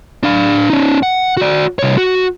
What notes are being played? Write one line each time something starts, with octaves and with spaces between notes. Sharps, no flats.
D4 F5
C#4 D#4
F#5
F#4 D5
C2 C#5
F#4